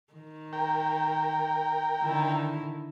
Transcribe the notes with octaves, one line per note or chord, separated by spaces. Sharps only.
D#3
A#4 G5
D3 D#3 E4